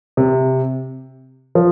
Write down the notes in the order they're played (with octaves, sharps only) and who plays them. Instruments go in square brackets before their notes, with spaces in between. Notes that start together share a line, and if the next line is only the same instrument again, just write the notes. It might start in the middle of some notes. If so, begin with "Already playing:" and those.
[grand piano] C3
F3